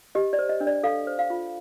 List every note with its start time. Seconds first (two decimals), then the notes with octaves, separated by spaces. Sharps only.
0.15 G4 D#5
0.33 D5
0.39 C5
0.49 D#5
0.60 D4
0.67 D5
0.83 A4 F5
1.07 C5
1.19 F5
1.30 F4